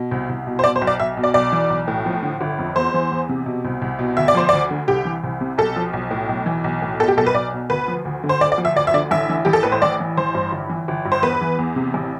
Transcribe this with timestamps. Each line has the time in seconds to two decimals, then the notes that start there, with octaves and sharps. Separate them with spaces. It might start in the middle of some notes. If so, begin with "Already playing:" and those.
Already playing: B2
0.11 C2
0.29 C2
0.47 B2
0.59 C5
0.64 B2 D5
0.76 C5
0.81 B1
0.87 D5
1.00 B1 E5
1.17 B2
1.23 D5
1.34 B1 D5
1.52 E3
1.70 B1
1.88 A2
2.06 F3
2.23 D3
2.41 G1
2.58 F2
2.76 E2 C5
2.94 E3
3.12 E2
3.29 C3
3.46 B2
3.65 C2
3.82 C2
3.99 B2
4.17 D2 E5
4.28 D5
4.35 F3 C5
4.49 D2 D5
4.71 D3
4.88 C2 G4
5.05 E3
5.24 C2
5.41 C3
5.58 B1 A4
5.76 F3
5.93 B1
6.11 A2
6.29 B1
6.46 E3
6.64 B1
6.82 A2
7.00 B2 A4
7.08 G4
7.17 B1 A4
7.27 B4
7.34 B1 D5
7.53 B2
7.70 D2 B4
7.88 F3
8.05 D2
8.24 D3
8.29 C5
8.41 D2 D5
8.52 D5
8.58 F3
8.65 E5
8.76 D2 D5
8.87 E5
8.94 D3 D5
9.11 A1 E5
9.29 E3
9.45 A1 G4
9.53 A4
9.63 A2 B4
9.72 C5
9.82 A1 D5
10.00 E3
10.17 A1 C5
10.34 G2
10.52 G1
10.69 E3
10.88 G1
11.05 G2
11.12 C5
11.22 E2 B4
11.41 E3
11.59 E2
11.76 C3
11.94 A1